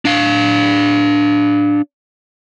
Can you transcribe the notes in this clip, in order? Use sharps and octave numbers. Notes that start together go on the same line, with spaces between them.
D4 F5